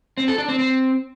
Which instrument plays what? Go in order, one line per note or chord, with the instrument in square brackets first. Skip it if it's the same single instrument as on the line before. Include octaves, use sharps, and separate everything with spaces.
[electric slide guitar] C4
A4
D4
C4
C4